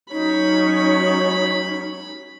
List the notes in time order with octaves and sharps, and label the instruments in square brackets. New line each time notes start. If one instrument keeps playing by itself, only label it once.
[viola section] F#3 C#4 C#5 [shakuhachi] D#4 [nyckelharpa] B5